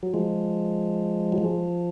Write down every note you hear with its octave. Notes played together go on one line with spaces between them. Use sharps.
F#3
F3 G#3
F#3
F3